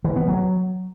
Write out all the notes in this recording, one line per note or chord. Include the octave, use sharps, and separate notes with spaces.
E3
B3
F#3